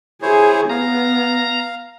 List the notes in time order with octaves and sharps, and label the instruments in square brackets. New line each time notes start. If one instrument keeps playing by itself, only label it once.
[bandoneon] E4 C5 C#5 [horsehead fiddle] G#4
[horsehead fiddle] B3 [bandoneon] F5 [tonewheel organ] A#5